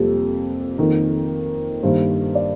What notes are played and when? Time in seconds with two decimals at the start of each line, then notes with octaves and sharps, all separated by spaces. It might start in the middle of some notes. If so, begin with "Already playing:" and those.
Already playing: F2 C3 G3 A#3 A4
0.78 F2 D#3 A#3 A#4
1.83 G2 D#3 A#3 C5
2.35 D5